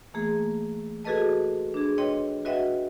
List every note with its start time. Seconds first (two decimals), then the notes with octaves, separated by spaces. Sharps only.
0.14 E3 A3 A#3 G#4
1.04 F#4 G#4 A4 B4 D#5 A5
1.74 D4 G#4
1.98 B4 C#5 D#5 G5 C6
2.45 F#4 B4 D#5 E5 F#5 G5